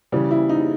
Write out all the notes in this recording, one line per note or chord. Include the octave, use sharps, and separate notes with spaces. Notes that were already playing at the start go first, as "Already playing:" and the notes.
C#3 E3 G3
E4
D#4